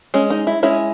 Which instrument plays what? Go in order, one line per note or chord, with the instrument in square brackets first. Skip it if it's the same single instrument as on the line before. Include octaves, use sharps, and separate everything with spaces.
[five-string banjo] G#3 C#4
D#4
E4
G#3 C#4 E4